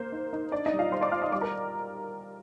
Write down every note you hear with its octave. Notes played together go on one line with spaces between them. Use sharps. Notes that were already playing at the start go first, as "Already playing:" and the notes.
Already playing: A#3 C5
D#4
D#4
D4 D5
D#4 D#5
G3
F4 F5
G3 C5 C6
D5 D6
F4 F5 F6
D#5 D#6
G3 D5 D6
A#4 A#5